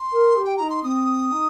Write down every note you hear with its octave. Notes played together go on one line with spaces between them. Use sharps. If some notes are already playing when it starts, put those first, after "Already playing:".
Already playing: C6
A#4
G4
G5
D#4 A#5
C6
C4 D#6
D#4